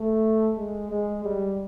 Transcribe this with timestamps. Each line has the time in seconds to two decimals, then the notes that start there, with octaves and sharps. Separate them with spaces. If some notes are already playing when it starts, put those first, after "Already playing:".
Already playing: A3
0.57 G#3
0.91 G#3
1.25 G3